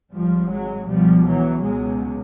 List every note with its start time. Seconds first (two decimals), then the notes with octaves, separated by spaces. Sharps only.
0.12 G#1 G#2 F3 G3
0.50 F#3 G#3
0.88 C#2 B2 F3 G3
1.26 E3 F#3
1.64 C#2 B2 F#3 G#3